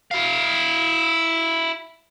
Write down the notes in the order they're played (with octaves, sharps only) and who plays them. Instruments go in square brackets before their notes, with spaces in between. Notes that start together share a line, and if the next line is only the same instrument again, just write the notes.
[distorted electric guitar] E4 F5